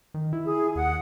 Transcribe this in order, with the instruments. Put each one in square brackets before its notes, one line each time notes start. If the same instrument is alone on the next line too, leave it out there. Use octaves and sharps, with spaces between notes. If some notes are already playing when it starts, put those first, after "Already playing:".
[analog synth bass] D#3
E4
[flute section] G#4
[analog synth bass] D#2 [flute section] F#5